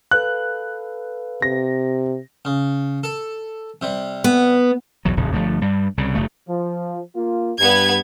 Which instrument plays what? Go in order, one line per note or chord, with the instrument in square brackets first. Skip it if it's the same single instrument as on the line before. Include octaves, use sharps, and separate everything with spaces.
[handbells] A4 B4 F5 [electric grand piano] F#6
[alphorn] C3 [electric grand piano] A#6
[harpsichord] C#3
A4
C3 G3
[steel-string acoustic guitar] B3
[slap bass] B1 E2 F#3
D1 A#1 F2 C#3
G1 F3 A3
G2 G3
C2 C#3
F#1 C#3 A3
[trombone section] F3
A#3 F4
[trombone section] G2 [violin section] B3 G#6